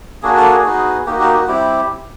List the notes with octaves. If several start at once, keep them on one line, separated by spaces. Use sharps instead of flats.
A#3 D4 F#4 G#4
A4
G#4
B3 D#4 F#4
A#3 D#4 F#4 G4
G4
F#4
G3 C4 E4 G4